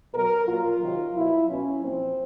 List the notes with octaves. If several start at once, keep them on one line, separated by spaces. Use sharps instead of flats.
B2 F#3 A#4
A#2 F#3 F4
C3 D#3 F#3
B2 F#3 E4
B2 F#3 C#4
A#2 F3 C4